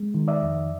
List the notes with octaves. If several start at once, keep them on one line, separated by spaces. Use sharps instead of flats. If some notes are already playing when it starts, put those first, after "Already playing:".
Already playing: G#3
D#3
D5 E5
F2